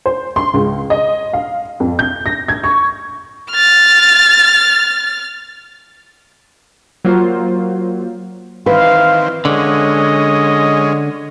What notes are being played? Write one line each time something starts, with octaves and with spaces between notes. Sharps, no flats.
C5
C6
C#2
D#5
F5
F2
G6
A#6
G#6
C#6
F6 A6
F#3 A#3 F4 C5
D#3 E3 C4 B4 F5
D3 G#3 C#4 D#5